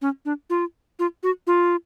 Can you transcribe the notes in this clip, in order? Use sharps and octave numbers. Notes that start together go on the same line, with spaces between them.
C#4
D4
F4
F4
F#4
F4